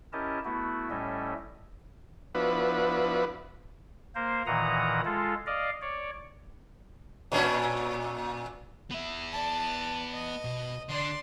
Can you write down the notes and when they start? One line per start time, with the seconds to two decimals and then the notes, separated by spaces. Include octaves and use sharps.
0.13 C#4 E4 G4 A#4 D#5 A5
0.45 A3 B3 E4 F#4
0.90 A2 G3 A3 C#4 D#5 E5
2.35 F3 B3 D4 E4 F#4 B4
4.15 A#3 A#4 C5
4.47 A#2 D#3 E3 F#5 A#5 D#6
5.05 G#3 F4 A4
5.46 D5 D#5 F5
5.81 C#5 D5
7.32 A#2 C#4 D4
8.91 B3 E5
9.32 D5 A5
10.14 D#5
10.45 B2
10.89 D3 D4 D5 C6